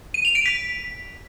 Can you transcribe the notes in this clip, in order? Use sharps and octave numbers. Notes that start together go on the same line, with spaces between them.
D#7
F7
D7
B6